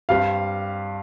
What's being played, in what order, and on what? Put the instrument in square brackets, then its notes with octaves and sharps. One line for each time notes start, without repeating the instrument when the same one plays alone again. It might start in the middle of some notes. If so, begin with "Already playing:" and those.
[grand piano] G2 G3 C4 F5